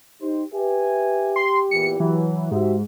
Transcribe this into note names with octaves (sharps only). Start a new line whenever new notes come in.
D#4 G4 C5
G4 B4 E5 G#5
C6
E2 A#2 E3 C#7
E3 F#3
G#2 F#4 G4 E5